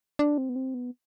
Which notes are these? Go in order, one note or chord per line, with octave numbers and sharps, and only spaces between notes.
D4
C4
B3
C4
B3